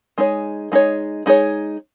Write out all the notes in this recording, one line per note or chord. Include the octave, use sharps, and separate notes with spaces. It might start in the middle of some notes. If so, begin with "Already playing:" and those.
G#3 D#4 G#4 C#5
G#3 D#4 G#4 C#5
G#3 D#4 G#4 C#5